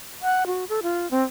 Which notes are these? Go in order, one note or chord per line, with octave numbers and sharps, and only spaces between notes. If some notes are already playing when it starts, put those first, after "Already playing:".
F#5
F#4
A4
F4
C4